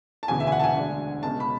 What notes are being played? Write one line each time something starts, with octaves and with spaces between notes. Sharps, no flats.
A5
E1 D2 C#3 E3 G#5
E5
G#5
F#5
A5
G#5
D2 D3 G#3 D4
C#2 B2 G#3 C#4 A5
B5